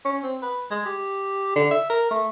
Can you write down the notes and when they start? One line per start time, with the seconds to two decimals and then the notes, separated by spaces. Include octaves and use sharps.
0.05 C#4
0.23 C4
0.42 B4
0.71 G#3
0.86 G4
1.56 D3
1.71 E5
1.90 A#4
2.11 A3